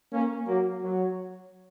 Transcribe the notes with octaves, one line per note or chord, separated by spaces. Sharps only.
A#3 C#4
F#3 A#3
F#3